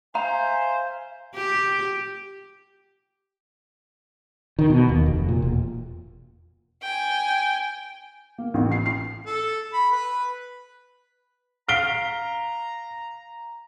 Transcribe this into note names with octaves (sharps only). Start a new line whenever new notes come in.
C5 E5 F5 G#5 A#5
G4
D#3
B2
D#2
F1
A#2
E1
G5 G#5
A#3
A1
C7
C7
A4
B5
B4
F5 A#5 F6 B6 C7 D7 G7